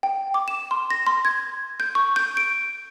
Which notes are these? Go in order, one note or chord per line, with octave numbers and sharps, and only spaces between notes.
G5
D6
E7
C6
A#6
C6
G#6
G6
C#6
G6
D7